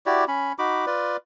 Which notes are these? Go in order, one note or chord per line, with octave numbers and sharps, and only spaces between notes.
E4 F#4 G4 D5
C#4 B5
D#4 F#4 B5 D6
F4 B4 D5